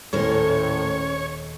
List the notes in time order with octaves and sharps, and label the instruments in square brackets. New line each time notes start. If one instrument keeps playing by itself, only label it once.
[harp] D#1 [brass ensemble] A2 [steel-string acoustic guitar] C#4 A#4 C5 [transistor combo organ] C#5